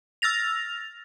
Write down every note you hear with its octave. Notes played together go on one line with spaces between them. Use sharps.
E6 F6 A6 A#6 F7